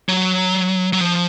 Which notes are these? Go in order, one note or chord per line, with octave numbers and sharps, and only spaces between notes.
F#3
F#3
F3